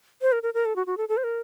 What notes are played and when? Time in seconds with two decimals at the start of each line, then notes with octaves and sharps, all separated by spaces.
0.22 C5
0.32 A#4
0.43 A#4
0.54 A#4
0.65 A4
0.76 F#4
0.87 F#4
0.97 A4
1.09 A4
1.17 C5
1.24 A#4